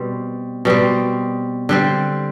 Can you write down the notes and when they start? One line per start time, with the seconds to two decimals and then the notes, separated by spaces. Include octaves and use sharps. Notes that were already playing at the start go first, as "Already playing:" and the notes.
Already playing: B2 G3 C4
0.65 B2 G3 C4
1.69 D3 G3 C4